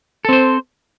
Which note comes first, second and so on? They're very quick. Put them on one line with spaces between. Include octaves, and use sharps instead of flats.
A4 C4 C5